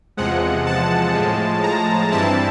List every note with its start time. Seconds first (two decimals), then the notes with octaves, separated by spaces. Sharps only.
0.17 E2 C3 F3 G#3 F#5
0.66 A5
1.14 A2 F3 G#3
1.63 A#5
2.11 G2 E3 G3 C4 E4 A5